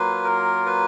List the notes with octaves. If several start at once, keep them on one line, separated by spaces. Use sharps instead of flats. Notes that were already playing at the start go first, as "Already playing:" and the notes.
Already playing: F#3 A#3 F4 B4
A#4
B4